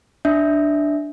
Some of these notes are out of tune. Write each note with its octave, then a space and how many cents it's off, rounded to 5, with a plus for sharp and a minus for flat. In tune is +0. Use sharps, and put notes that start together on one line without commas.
D4 +0 E5 -15